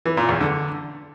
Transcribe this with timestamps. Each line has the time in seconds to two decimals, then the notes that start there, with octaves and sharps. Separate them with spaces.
0.06 E3
0.17 A#2
0.29 E2
0.40 D3